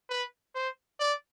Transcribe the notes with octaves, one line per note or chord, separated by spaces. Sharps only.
B4
C5
D5